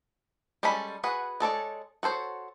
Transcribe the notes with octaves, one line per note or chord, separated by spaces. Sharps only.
G3 G#3 C#4 A4 B5
F#4 G#4 B4 F#5
G#3 A4 C#5 D5
F#4 A4 C5 C#5